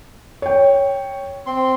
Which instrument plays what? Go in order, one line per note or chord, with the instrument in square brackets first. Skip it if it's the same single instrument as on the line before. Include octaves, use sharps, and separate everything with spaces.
[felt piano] C#5 G5
[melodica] C4 C6